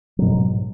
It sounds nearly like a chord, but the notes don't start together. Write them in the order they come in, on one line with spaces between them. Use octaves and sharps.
F#3 B2 G#2